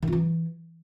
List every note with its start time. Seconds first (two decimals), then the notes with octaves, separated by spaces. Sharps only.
0.03 D#3
0.08 F4
0.13 E3